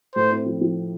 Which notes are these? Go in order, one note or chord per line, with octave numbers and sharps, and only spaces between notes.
A2 C5
C4
F3
F3